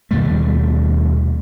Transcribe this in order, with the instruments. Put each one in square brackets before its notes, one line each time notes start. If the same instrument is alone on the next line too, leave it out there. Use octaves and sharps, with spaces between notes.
[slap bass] D#2 B2 G3 A3